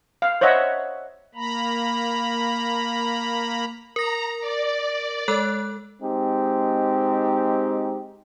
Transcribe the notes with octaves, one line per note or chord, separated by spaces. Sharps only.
F5
C5 C#5 D#5 E5 F#5
A#3 A#5 B5
A#4 A#5 A#6
D5
G#3 A4 F#6
G#3 C4 D#4 G4